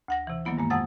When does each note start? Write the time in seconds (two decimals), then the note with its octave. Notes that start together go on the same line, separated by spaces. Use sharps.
0.08 D2 F#5 A#6
0.27 C3 E3
0.45 D#3 F#3 A#3 B3 E4
0.58 G2 G#3 A#3
0.70 F2 C3 G#3 F#5 D#6 A6